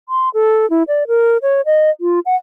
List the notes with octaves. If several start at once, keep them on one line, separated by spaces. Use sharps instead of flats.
C6
A4
E4
D5
A#4
C#5
D#5
F4
F#5